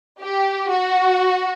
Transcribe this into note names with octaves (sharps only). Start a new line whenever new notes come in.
G4
F#4